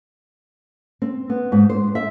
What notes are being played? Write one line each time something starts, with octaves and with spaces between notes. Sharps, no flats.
C4
B3
G#2
C5
E5